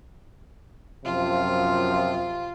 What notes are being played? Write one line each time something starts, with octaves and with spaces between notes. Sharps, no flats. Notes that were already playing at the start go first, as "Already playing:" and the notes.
F#2 C3 F3 F4